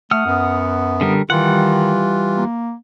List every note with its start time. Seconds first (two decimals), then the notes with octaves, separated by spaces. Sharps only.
0.11 A3 F#5 D#6 F6
0.26 F#2 B3
1.01 D3 G3 A#4
1.30 D#3 E3 G3 F4 F#5
2.37 A#3